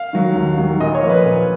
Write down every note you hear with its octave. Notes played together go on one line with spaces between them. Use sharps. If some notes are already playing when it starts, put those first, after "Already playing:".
Already playing: F5
D#3 F#3
D#2
D#3 F#3
A#2 D#5
C#5
F3 A#3
B4
A#2